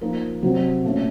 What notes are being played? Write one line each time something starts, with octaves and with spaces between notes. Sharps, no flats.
F3 A#3 D#4 A#4
C3 F#3 C4 F#4
A#2 A3 C#4